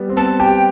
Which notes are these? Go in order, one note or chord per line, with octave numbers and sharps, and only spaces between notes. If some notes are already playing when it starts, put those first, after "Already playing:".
Already playing: G3 B3
C4
B3 A5
G4 G5